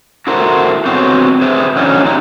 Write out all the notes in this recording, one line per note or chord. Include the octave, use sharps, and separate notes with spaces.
E4 F#4 A4 A#4 C5
B3 C4 F#4 G4 C5 C#5
G#4 B4 C5 E5
D3 E3 F#3 C#4 D#4
C4 D#4 E4 G4